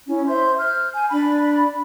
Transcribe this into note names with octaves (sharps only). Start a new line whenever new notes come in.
C#4 E4
C5 E5 C6 G6
F6 G6
G#5 G6
D4 B5